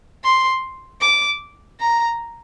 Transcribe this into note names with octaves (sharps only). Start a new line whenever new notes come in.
C6
D6
A#5